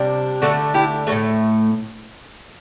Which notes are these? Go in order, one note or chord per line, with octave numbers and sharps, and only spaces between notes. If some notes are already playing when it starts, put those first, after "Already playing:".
Already playing: C3 G3 D4
D3 A3 D4 F#4 A4
E4 G4
F#3 A3 F#4 A4
A2